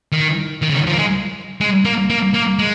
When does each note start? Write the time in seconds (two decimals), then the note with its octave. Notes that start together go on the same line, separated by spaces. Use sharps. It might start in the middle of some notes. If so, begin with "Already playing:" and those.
0.12 D#3
0.62 D#3
0.69 C#3
0.74 D#3
0.87 F3
0.92 A#3
0.99 G#3
1.61 G#3
1.85 A#3
2.10 A#3
2.34 A#3
2.59 G#3